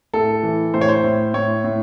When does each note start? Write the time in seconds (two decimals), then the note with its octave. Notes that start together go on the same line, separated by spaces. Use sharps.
0.13 A2 A4
0.43 E3
0.74 A2 C5
0.81 C#5
0.89 C5
1.04 A2
1.34 A2 C#5
1.64 A2